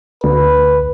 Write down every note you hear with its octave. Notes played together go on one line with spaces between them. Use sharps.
D2 B4